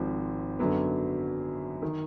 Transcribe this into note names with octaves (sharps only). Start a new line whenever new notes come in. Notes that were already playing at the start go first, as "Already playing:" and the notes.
Already playing: G#1 G#2 F3 C4
F#2 D3 F#3 B3
D#3